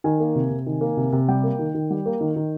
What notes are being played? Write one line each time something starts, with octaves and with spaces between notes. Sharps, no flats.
D#3 G#5
A#3
C3
C3
D#3
A#3
C3
C3
G3 G5
A#3
D#3
D#3
G3
A#3
D#3
D#3